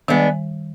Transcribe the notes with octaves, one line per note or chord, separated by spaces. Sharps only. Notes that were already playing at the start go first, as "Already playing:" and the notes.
D#3 G3 G#3 B3 D4